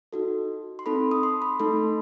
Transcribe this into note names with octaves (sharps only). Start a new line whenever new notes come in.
D#4 F#4 A4
C6
C4 D#4 A4 B5
D#6
C6
B5
A3 D#4 A4 C6